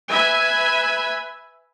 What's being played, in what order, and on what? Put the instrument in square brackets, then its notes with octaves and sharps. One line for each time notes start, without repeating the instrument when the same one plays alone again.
[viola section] B4 E5 G#5 B5